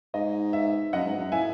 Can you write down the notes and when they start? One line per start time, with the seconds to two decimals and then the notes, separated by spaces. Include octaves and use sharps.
0.14 G#2 D#5
0.53 E5
0.93 F#2 D#5 F#5
1.05 G#2
1.17 F#2
1.32 A2 E5 G#5